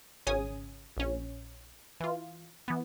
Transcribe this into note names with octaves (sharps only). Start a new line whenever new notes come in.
G#1 C#3 C#4 G#5 D#6
A#1 C#4
E3 F4
E3 B3